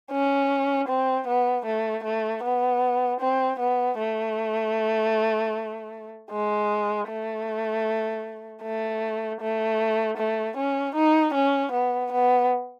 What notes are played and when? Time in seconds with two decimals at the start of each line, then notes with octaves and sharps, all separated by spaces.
0.11 C#4
0.88 C4
1.28 B3
1.66 A3
2.04 A3
2.43 B3
3.21 C4
3.60 B3
3.98 A3
6.31 G#3
7.09 A3
8.63 A3
9.41 A3
10.18 A3
10.57 C#4
10.95 D#4
11.34 C#4
11.73 B3
12.13 B3